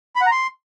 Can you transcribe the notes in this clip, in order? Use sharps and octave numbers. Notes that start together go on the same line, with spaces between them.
B5
F#5
A#5
C6